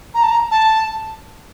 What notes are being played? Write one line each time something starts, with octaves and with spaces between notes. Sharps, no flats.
A#5
A5
A#5
A5